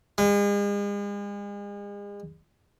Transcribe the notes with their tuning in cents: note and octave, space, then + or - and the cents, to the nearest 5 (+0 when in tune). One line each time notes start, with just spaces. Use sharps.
G#3 -40